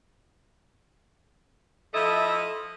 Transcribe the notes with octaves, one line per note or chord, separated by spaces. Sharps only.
F3 A3 E4 A4 D#5